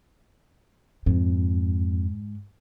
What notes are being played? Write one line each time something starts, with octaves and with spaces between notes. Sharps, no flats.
F2 G#2